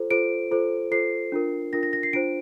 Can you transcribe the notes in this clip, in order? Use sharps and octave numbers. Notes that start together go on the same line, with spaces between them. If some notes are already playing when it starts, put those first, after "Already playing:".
Already playing: F4 A4 C5
F4 A4 C5 D7
F4 A4 C5
F4 A4 C5 C7
D4 F4 A#4
D4 F4 A#4 A#6
A#6
A#6
C7
D4 F4 C5 D7